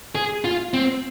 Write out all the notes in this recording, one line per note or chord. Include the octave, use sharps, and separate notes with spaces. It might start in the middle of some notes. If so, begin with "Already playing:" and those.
G#4
F4
C4